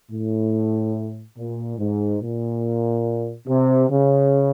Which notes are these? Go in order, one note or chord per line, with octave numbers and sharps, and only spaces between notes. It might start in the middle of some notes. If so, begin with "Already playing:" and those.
A2
A#2
G#2
A#2
C3
C#3